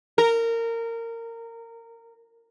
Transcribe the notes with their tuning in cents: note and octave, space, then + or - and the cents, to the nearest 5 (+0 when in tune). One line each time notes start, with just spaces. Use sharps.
A#4 -20